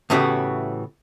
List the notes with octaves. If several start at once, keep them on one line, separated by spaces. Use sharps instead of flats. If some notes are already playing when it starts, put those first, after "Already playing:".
A2 C#3 E3 B3 F#4 G4